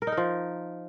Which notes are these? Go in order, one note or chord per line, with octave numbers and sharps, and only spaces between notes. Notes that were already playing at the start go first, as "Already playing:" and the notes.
A#4
D#4
A#4
F3